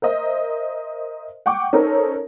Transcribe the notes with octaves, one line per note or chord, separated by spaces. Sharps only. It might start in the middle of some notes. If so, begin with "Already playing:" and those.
A#4 C5 D#5 E5
F#5 G5 C#6 D6
C#4 D#4 A4 A#4 C5